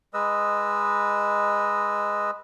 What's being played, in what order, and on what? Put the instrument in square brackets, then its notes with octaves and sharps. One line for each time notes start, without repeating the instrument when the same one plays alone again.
[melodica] G#3 B4 D#5 E6